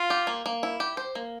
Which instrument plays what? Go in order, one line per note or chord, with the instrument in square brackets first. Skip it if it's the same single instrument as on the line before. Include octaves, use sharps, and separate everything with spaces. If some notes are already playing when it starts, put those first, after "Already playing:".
Already playing: [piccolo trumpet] F4
[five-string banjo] G4
A#3
A#3
E4
G4
C5
A#3